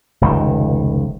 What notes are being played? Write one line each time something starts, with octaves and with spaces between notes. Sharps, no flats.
F1 C#2 D#3